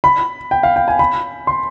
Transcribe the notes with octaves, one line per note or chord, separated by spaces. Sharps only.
B5
G5
F5
G5
G#5
B5
C6